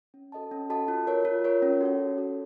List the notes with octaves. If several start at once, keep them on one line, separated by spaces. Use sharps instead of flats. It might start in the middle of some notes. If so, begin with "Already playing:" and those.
C#4
F#4 A4 D#5 A5
C#4
F#4 A4 D#5 A5
F4
A#4 C#5
F4
A#4 C#5
C#4
F#4 A4 C#5
C#4
F#4 A4 C#5